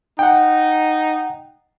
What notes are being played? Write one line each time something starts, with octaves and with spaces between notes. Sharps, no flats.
D#4 F#5 G5